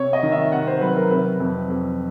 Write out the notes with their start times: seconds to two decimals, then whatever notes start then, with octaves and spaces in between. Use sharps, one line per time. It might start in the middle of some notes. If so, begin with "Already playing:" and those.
Already playing: C3 C#5
0.13 D#5
0.23 D#3
0.32 E5
0.52 C3 F#5
0.67 C5
0.81 F#3 B4
0.96 A#4
1.11 C3 B4
1.40 F2
1.70 F2